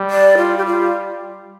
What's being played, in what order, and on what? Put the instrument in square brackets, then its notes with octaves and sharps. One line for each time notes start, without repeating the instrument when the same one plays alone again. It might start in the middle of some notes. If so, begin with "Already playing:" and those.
Already playing: [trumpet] G3
[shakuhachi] D5
F4
G4
F4